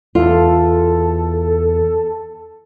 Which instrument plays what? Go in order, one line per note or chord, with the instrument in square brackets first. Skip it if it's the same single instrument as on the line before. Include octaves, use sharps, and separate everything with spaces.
[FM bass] E2 [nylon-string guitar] F4 [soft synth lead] A4